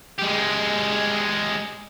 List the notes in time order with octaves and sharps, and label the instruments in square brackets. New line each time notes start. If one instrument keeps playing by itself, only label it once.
[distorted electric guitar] G#3 G4